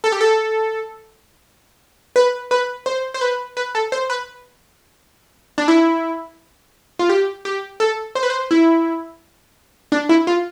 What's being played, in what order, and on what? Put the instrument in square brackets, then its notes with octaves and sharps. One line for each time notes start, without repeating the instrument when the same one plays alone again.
[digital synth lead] A4
G4
A4
B4
B4
C5
C5
B4
B4
A4
C5
B4
D4
E4
F4
G4
G4
A4
C5
B4
C5
E4
D4
E4
F4